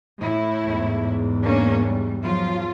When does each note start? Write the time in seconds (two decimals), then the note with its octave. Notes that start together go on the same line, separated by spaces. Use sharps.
0.20 A2 E4
0.66 E2 G#2
1.44 A#3 C#4 D4
1.86 G3
2.24 F3 F#3 F4